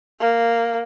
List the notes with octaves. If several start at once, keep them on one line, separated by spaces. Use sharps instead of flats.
A#3